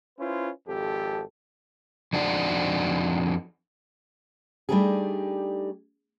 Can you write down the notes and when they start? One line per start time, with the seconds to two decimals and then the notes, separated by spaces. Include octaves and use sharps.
0.19 C#4 E4 F4 B4 C5
0.68 G#1 F2 G4 A4
2.13 F2 D4 D#4 F#4 D5
4.69 G3 A3 D4 D#4 G4 G#4